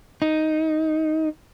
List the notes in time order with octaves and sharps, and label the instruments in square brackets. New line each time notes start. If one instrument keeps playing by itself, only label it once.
[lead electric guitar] D#4